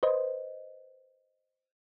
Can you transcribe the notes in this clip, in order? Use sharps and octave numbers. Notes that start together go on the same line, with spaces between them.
B4 C5 D#5